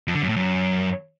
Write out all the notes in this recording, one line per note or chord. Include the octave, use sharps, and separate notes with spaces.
F2
D3
F#2
A2
F#2